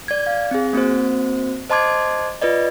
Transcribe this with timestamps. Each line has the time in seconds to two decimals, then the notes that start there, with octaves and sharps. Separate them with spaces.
0.08 D5 G#6
0.27 F5
0.51 C4 G#4
0.73 A#3 C4 F#4 C5
1.70 C5 D#5 A5 C6 D6 G#6
2.42 F4 B4 D5 D#5